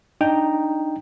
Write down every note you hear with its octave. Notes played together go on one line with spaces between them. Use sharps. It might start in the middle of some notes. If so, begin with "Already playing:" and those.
D4 D#4 G5 A#5